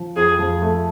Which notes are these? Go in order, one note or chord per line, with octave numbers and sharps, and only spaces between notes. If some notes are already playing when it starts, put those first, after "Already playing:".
Already playing: F3
F2 G#4
F3
A3